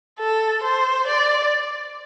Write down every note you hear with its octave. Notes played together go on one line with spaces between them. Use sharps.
A4
C5
D5